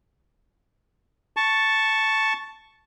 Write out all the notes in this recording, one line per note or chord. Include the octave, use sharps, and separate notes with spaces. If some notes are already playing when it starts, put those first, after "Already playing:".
A5 C#6